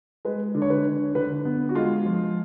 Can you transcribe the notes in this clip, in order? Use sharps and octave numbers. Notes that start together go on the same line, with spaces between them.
G#3 B4
D3
C#5
B4
D3
D3 B4
B3
F#4
G#3 F4
F3